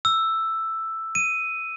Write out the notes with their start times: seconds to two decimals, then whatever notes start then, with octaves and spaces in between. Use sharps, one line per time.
0.05 E6
1.15 D#7